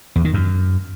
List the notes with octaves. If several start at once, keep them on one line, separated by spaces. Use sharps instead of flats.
E2
D#3
F#2